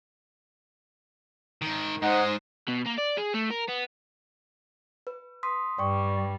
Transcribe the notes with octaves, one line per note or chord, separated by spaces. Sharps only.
G#2 D#3
G#2 G#3 D#4 C5 F#5
B2
A#3
D5
G#4
A3
A#4
B3
B4
C6 D#6 B6
G2 G3 D5 G5 C#6